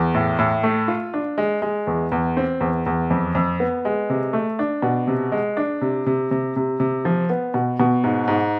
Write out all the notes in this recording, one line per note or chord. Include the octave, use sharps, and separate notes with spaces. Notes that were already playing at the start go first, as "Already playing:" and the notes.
Already playing: E2
A2
A2
A3
F4
D4
G#3
G#3
E2
E2
C4
E2
E2
F2
F2
B3
G#3
C3
A3
D4
B2
C3
G#3
D4
C3
C3
C3
C3
C3
F3
B3
B2
B2
G#2
G#2